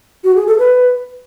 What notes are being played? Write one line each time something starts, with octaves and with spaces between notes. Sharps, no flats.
F#4
G#4
A4
B4